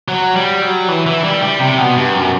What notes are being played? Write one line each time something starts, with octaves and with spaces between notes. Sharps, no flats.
F#3
G3
F#3
E3
E3
G3
G3
C3
B2
G2
F#2